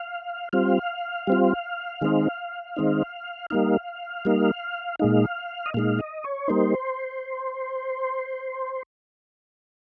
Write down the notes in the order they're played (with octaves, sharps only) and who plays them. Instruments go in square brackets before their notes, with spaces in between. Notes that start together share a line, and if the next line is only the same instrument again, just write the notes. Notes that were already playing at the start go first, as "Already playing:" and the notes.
Already playing: [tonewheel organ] F5
G3 C4 F4 F5
G3 C4 F4
D#3 G#3 C4 D#4
D#3 G#3 C4 D#4
G3 A#3 D#4 F5
G3 A#3 D#4
A#2 G#3 D#4 F5
D#5
A#2 G#3 D#4 F5
D#5
C#5
G3 A#3 D#4 C5